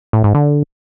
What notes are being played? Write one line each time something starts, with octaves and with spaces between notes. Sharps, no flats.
A2
G#2
D3